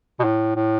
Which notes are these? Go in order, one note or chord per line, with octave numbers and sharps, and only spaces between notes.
B2
A2
A2